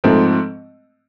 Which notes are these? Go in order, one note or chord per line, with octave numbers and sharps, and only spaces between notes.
G#2 F3 A3 C4